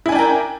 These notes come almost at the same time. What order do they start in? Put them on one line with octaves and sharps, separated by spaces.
E4 G#5 D4 G5 A#4